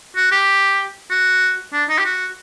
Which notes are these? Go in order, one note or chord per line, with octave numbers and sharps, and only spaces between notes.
F#4
G4
F#4
D4
D#4
G4
F#4